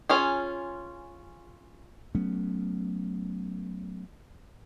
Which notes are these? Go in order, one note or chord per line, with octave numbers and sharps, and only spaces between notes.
C#4 F4 G#4
F#3 A3 B3 C#4